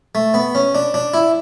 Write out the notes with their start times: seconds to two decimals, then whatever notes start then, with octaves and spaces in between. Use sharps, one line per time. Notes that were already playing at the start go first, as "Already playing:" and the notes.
0.15 A3
0.34 B3
0.55 C#4
0.75 D4
0.94 D4
1.14 E4